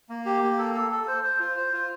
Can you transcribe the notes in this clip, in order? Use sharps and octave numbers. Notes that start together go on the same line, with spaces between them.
A#3
G4
A#3
A4
A4
A4
C5
C5
F4
C5
F4